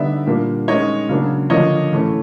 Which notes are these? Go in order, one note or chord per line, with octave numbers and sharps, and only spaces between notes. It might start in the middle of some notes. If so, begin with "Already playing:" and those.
Already playing: D3 G3 B3 D#4 D5 E5
A#2 G3 A#3 D4
D#3 G#3 C#4 C#5 D#5
C#3 F#3 A#3 D4
D3 F3 A#3 D4 C#5 D#5
A2 E3 A3 C#4